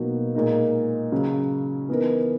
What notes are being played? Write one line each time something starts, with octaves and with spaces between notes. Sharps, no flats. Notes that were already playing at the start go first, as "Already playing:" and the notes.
Already playing: B2 F#3 A#3 D#4 F#4
A#2 G#3 D#4 A#4
C#3 F#3 C#4
E3 B3 D#4 A#4